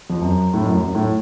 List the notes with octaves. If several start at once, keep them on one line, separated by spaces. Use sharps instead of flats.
F2
F#2
A2
F#2
F#2
A2